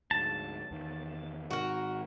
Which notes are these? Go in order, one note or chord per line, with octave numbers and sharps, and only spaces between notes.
D2 G#2 A5
E2 D#3
G#2 D#3 F#4 A#4